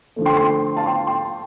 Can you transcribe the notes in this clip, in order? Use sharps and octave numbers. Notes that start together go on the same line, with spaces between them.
D3 F3 A3
G5 C6
G5 C6
F5 A5
G5 C6
G5 C6